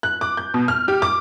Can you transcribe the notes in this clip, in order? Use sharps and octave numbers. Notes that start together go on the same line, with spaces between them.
F#6
D6
G6
B2
F6
G4
D6